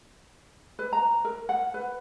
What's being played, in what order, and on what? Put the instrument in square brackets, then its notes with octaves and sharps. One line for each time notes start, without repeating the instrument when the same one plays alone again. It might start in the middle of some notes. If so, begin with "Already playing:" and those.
[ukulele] B4
A#5
A#4
F#5
B4